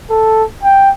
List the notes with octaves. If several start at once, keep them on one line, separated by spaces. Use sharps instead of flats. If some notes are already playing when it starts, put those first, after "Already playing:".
A4
G5